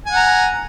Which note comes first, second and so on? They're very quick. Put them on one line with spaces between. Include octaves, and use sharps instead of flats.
G#5 F#5 A#5